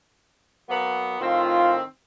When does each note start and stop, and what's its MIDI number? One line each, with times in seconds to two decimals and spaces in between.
0.69 1.18 54
0.69 1.18 58
0.69 1.18 59
1.21 1.83 45
1.21 1.83 51
1.21 1.83 60
1.21 1.76 65